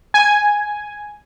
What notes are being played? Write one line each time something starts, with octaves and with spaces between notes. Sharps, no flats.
G#5